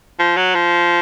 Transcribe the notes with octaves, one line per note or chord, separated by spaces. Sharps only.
F3
F#3
F3